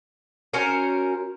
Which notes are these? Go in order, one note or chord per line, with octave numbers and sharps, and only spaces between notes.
C#4 F#4 A#4 C5